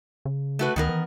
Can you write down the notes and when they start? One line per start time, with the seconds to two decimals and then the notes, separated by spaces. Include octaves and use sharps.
0.25 C#3
0.59 A3 F#4 B4
0.76 D2 D#3 B3 A#4
0.89 E3